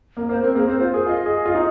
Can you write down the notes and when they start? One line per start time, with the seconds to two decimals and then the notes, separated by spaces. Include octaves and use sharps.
0.17 A#3
0.29 A#3 C5
0.43 C4 A#4
0.55 A#3 G#4
0.68 C4 C5
0.80 F4 C5
0.93 G#4 A#4
1.06 F4 D#5
1.26 G#4
1.45 F4
1.55 D#4